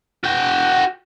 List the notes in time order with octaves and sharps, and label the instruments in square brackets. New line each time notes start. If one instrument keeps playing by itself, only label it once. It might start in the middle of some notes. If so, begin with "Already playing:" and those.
[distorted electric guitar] F#4 G5